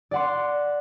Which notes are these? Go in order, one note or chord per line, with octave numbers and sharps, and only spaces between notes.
D5 F#5 C6